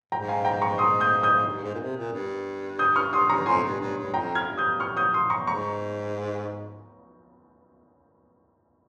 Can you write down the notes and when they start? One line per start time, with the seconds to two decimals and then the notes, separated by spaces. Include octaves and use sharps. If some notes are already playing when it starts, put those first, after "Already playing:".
0.12 G#2 G5 A#5
0.28 F5 G#5
0.45 G5 A#5
0.61 A#5 C#6
0.78 C6 D#6
1.00 D#6 G6
1.23 D#6 G6
1.46 G2
1.63 G#2
1.74 A#2
1.79 C3
1.96 A#2
2.12 G2
2.79 D#6 G6
2.96 C#6 F6
3.13 C6 D#6
3.29 A#5 C#6
3.46 F2 G#5 C6
3.63 G2
3.80 G2
3.97 G2
4.14 F2 G5 A#5
4.35 F6 G#6
4.47 G2
4.57 D#6 G6
4.80 C#6 F6
4.97 D#6 G6
5.14 C6 D#6
5.30 A#5 C#6
5.47 G#2 A#5 C#6